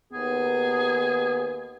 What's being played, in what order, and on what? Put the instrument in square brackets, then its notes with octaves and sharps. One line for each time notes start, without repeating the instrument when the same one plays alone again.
[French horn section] D#2 B3 [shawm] G#4